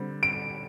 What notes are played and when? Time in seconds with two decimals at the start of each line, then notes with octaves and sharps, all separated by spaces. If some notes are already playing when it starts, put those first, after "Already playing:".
Already playing: D3 G3 C4
0.23 D7